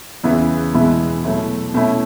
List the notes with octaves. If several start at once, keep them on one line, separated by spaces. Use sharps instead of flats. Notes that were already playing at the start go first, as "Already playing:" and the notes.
E2 C#3 E3 B3 E4
E2 B2 G#3 B3 E4
B2 F#3 A3 E4
B2 A3 C#4 E4